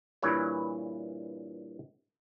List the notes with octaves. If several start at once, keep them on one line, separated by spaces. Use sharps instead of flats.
G2 A#2 E3 E4 B4 C#5